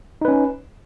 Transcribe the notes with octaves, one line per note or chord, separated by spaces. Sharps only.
C#4 D#4 B4